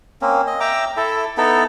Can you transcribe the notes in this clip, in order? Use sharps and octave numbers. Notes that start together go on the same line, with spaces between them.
A#3 C4 C#4
D#5
E5 G5 A#5 D6
E4 A4 E5
B3 D#4 E4 A4